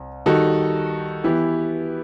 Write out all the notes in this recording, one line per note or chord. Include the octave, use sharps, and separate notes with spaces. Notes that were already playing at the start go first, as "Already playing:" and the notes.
Already playing: C2
D#3 G3 D#4 F#4 A4
E3 B3 E4 G4